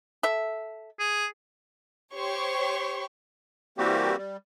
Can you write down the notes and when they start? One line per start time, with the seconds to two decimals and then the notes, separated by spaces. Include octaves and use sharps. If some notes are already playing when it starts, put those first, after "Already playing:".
0.23 A4 E5
0.99 G#4
2.14 G4 C5 C#5 C6 C#6
3.78 E3 G3 A#3 C4 F#4 G4
4.17 G3